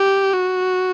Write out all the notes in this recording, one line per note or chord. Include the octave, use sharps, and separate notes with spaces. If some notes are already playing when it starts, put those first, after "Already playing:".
Already playing: G4
F#4